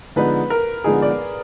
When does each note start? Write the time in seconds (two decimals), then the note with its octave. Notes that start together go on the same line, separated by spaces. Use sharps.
0.16 D3 F3 G#3 B3 D#4 B4
0.50 A#4
0.84 D3 F3 G#3 B3 D#4 G#4
1.02 D5